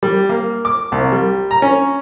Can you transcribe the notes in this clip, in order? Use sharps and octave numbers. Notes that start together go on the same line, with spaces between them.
G3
A#3
D6
C2
G3
A#5
C#4